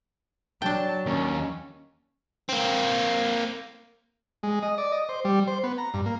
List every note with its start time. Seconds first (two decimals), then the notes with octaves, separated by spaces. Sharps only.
0.62 F#3 D4 G5 A5
1.06 D#2 C#4
2.49 A#3 C4
4.43 G#3
4.63 D#5
4.78 D5
4.92 D#5
5.09 C5
5.25 G3
5.47 C5
5.64 B3
5.78 A#5
5.94 G2
6.06 A#3